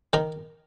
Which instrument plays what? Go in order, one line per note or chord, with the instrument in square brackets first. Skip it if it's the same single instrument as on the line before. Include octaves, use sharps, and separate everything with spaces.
[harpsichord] D#3 A#4